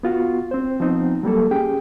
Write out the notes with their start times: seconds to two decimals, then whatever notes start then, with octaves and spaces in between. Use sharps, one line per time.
0.03 B3 F4 F#4
0.51 C4 C5
0.80 F3 B3 C4 D#4
1.23 F#3 G3 A#3 A4
1.51 C#4 G4 G#4 G5